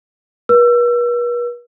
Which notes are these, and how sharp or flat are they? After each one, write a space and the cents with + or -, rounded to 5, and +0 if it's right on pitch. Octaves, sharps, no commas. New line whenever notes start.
B4 -45 E6 +30